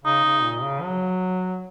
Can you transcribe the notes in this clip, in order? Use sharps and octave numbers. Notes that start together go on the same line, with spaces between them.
C#3 D#4
C#3
A#2
C#3
F#3